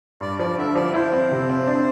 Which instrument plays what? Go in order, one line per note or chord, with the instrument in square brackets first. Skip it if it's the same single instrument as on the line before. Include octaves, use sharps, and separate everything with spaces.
[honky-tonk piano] G2 [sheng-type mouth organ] D5
[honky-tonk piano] F3 [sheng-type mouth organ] D5
[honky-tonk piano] D3 [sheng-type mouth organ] E5
[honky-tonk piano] F3 [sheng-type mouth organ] D5
[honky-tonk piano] E4 [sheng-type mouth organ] C5
[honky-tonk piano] C4
C3
C4
D4